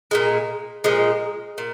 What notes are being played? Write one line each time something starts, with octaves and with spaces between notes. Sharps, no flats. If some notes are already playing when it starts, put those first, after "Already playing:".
A#2 F3 G#3
A#2 F3 G#3
A#2